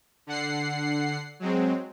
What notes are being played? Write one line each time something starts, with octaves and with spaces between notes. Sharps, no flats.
D3 F#5 C7
F#3 G#3 C4